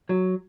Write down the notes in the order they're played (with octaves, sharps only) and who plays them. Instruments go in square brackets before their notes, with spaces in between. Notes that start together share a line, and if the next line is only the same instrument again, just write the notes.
[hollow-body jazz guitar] F#3